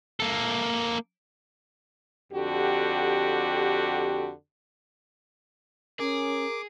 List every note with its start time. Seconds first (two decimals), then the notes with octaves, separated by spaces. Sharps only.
0.20 A#3 A4
2.33 F2 D3 F#4 G4
6.00 C#4 G#4 A#4 D6